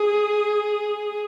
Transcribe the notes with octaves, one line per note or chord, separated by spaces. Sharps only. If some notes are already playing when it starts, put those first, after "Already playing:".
Already playing: G#4